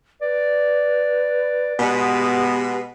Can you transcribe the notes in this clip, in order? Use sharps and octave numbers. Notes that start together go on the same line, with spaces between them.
B4 D5
B2 G#3 B3 G4